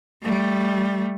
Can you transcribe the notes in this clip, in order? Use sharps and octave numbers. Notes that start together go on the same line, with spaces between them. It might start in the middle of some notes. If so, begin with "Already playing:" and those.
G3 A3